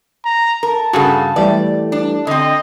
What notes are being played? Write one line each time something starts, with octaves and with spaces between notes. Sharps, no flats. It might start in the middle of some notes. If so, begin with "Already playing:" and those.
A#5
A#4 A5
G2 C#3 F#4 G#4 A4
E3 G3 A3 D5
D4
D3 C4 D#5